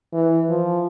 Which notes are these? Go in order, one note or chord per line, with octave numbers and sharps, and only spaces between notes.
E3
F3